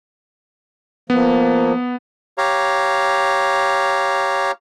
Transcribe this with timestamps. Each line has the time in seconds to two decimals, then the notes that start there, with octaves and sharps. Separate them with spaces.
1.10 F3 A#3 B3
2.38 G4 C#5 F5 A#5